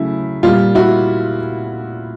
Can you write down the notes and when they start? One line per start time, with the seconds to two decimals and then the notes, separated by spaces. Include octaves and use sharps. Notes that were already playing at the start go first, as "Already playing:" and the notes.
Already playing: C#3 F#3 A3 E4
0.43 A#2 G3 F4
0.75 E4 F#4